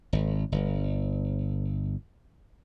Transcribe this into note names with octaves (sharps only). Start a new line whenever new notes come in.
G#1
G1